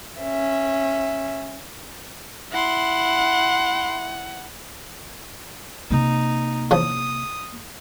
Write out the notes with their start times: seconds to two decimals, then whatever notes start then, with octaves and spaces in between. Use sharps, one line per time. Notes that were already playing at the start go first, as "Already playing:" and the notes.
0.19 C#4 E5
2.52 E4 F#5 C6
5.91 C3 A#3 D#4
6.71 E2 C#3 F3 D#6